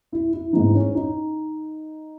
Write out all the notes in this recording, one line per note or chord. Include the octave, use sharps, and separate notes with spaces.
E4
E4
G#2 E3 D#4
C#4
D#4